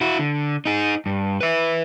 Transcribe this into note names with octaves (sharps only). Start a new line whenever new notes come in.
E4 F#4
D3
D#4 G#4
G2
B4 E5